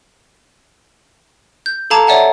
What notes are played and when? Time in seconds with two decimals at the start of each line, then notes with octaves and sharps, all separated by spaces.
1.66 G6
1.90 A4 F5 A5 A#5 D6 G#6
2.07 C#5 D5 E5 F#5 A5